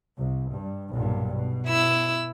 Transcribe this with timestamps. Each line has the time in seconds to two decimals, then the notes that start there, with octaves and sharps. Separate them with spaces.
0.17 C2
0.52 G2
0.92 B1 G2 A#2
1.34 B2
1.66 E4 E6